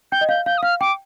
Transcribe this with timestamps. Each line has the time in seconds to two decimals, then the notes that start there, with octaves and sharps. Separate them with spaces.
0.12 G5 G6
0.21 D#5
0.29 F5 G6
0.46 F5 G6
0.58 D#6
0.63 F5 F6
0.81 G5 D6